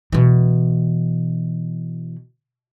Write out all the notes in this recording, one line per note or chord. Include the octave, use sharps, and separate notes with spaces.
B2 E3